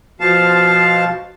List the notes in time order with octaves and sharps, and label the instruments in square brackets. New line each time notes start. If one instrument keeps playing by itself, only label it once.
[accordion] B2 F3 F5 A5